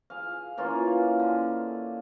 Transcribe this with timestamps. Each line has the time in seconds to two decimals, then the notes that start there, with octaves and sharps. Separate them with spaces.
0.10 G#4 F5
0.57 E3 A#3 C#4 F4
1.19 D3